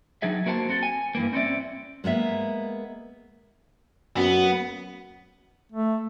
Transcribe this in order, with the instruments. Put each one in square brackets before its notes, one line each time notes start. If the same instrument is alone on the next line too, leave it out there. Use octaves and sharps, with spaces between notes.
[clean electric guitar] F#3 D4 D#4 G#4 E5
A#3 F#4 A#4 C5 F5 A5
C4 F#4 A4
G#5
G2 E3 A#3
C4 C#4 E4 D5 E5
[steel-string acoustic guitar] G#3 A#3 B3 E5
[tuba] F#2 [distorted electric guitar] B3 [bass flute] F#4
[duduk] A3